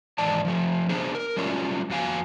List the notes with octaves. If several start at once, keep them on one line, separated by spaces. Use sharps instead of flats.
G#2 D#3 E3 D5 A5
F3 A3
B3 D4 G#4 C5
A#4
F#3 G3 A3 C#4 F4 F#4
F2 F#4 F5 G#5